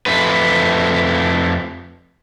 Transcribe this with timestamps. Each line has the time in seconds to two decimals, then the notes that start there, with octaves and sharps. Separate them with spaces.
0.06 F2 A3 B4